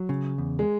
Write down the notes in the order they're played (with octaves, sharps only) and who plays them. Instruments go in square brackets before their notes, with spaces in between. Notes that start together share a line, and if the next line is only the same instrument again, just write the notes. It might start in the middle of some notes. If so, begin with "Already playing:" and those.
Already playing: [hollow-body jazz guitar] F#3
C#3
E2
[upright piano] G#3